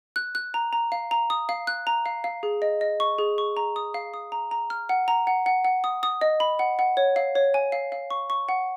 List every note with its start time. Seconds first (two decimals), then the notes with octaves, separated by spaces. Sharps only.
0.16 F#6
0.35 F#6
0.54 A#5
0.73 A#5
0.92 F5
1.11 A#5
1.30 D#6
1.49 F5
1.67 F#6
1.87 A#5
2.06 F5
2.24 F5
2.43 G#4
2.62 D#5
2.81 D#5
3.00 C#6
3.18 G#4
3.38 C#6
3.57 A#5
3.76 D#6
3.94 F5
4.14 D#6
4.32 A#5
4.51 A#5
4.70 F6
4.89 F#5
5.08 A#5
5.27 F#5
5.46 F#5
5.65 F#5
5.84 D#6
6.03 D#6
6.21 D#5
6.40 B5
6.59 F#5
6.79 F#5
6.97 C#5
7.16 F5
7.35 C#5
7.54 G#5
7.72 F5
7.92 F5
8.10 C#6
8.30 C#6
8.49 F#5